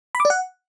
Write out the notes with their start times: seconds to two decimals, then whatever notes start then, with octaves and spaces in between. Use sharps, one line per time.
0.15 B5
0.20 D6
0.25 D5
0.30 F#5